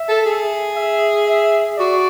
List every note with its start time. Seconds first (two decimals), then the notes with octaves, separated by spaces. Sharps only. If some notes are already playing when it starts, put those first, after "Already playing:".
Already playing: E5
0.09 A4
0.25 G#4
0.76 E5
1.26 E5
1.78 F#4 D5